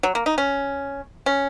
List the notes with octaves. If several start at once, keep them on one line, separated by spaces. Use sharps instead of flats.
F#3
A#3
D#4
C#4
C#4